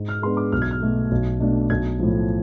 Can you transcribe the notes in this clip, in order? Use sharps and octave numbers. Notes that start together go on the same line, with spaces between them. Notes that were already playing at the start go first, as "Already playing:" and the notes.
Already playing: G#2
F6
G#3 B3 D4 C6
D6
B1 F6
G#6
F6
B2 A3
B1
B2 A3 D4
B1 G#6
A2 F3